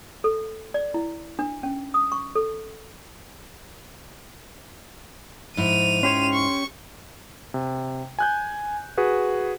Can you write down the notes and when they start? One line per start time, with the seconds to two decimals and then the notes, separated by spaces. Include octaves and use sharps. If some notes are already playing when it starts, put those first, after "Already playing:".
0.24 A4
0.74 D5
0.94 E4
1.39 D4
1.63 C#4
1.94 D#6
2.12 C#6
2.35 A4
5.57 G#2 F3 E4 D#7 F7
6.03 C#4 G4 C#5 C6
6.33 C#6
7.54 C3
8.19 G#5 F#6 G6
8.97 F#4 G#4 B4